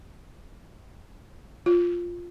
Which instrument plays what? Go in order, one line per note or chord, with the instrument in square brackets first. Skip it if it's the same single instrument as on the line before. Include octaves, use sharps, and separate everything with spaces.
[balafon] F4